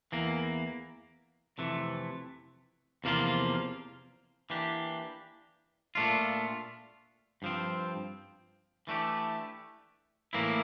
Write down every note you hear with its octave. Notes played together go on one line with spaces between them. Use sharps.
E2 E3 A#3
F2 C3 E3 A3
E2 C3 F3 A#3 F4
E3 A#3 D4 G4
A#2 A3 D4 F4
G2 F3 C4
E3 A3 D4 G4
A2 E3 A#3 E4